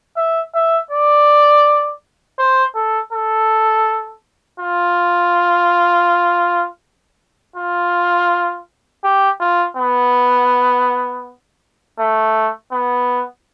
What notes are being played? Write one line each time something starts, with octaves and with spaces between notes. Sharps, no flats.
E5
E5
D5
C5
A4
A4
F4
F4
G4
F4
B3
A3
B3